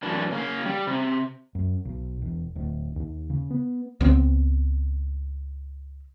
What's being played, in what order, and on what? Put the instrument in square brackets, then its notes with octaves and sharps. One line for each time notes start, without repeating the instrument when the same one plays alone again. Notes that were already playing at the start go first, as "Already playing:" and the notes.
[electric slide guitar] F#2 E3 D4
C#3 A#3 F5
G3
C3
[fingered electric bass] F#2
B1
E1
D1
D#2
C#3
B3
[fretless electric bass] C#2 B3 C4